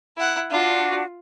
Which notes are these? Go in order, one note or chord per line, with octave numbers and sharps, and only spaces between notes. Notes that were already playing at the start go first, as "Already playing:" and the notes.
E4 F#5
D4 F4 F#4